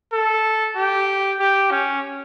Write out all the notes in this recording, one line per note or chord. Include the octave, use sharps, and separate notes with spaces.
A4
G4
G4
C#4